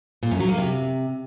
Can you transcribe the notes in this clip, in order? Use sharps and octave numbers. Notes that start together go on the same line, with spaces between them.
A#2
F#2
F#3
A#3
C3